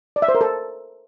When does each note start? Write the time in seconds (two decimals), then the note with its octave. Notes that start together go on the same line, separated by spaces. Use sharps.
0.16 D5
0.22 E5
0.28 C5
0.35 A#4
0.41 A4